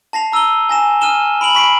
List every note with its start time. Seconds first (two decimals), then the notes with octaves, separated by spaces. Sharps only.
0.13 A5 A#6 C7 F7
0.32 A#5 E6 D#7 F7 G7
0.69 G#5 A#6 E7
1.01 D#6 F6 D#7 E7 G7
1.41 B5 D7 F7 F#7
1.55 B5 C#6 B6 C7 D7